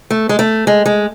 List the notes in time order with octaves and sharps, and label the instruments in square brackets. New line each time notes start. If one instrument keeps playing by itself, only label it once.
[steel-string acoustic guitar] A3
G#3
A3
G#3
G#3